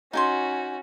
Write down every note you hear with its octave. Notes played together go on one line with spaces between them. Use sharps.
C#4 D#4 F#4 G#5 C6